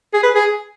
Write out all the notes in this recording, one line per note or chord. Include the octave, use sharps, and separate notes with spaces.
G#4
B4
G#4